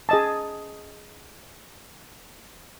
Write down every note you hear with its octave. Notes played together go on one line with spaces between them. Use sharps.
G#4 D#5 A5